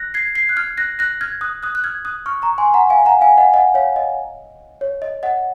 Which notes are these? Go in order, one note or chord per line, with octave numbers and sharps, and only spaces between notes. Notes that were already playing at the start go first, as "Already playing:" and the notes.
Already playing: F#6 A#6
G#6 C7
G#6 C7
F#6
F6 G#6
F#6 A#6
F#6 A#6
F6 G#6
D#6 F#6
D#6 F#6
F#6
F6 G#6
D#6 F#6
C#6 F6
A#5 C#6
G#5 C6
F#5 A#5
F5 G#5
F#5 A#5
F5 G#5
D#5 F#5
D#5 F#5
C#5 F5
D#5
C#5
D#5
D#5 F#5